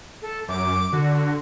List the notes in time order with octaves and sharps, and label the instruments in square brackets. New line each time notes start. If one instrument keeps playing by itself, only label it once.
[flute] A4
[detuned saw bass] F#2 [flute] D6
[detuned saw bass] D3 [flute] F#4